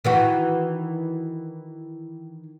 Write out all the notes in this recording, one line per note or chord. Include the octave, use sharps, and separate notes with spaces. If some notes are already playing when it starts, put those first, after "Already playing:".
D#3 E3 F#4